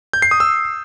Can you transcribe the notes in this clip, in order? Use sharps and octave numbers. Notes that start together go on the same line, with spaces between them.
G6
C7
D#6
E6